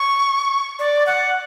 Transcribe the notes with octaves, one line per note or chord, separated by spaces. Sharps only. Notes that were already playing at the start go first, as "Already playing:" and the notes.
Already playing: C#6
D5
F#5